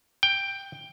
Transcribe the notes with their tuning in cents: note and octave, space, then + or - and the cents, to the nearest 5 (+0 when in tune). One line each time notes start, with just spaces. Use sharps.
G5 +10